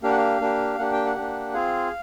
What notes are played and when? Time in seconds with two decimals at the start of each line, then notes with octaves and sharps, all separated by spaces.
0.02 A#3 D4 G4 F5
0.10 F#5
0.18 F5
0.40 A#3 D4 G4
0.78 A#3 D4 G4 F#5
0.93 G5
1.06 F#5
1.16 A#3 D4 G4
1.54 C4 F4 G#4 F5